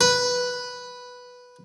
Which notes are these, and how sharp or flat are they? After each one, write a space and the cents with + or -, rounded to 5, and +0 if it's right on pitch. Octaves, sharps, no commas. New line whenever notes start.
B4 -5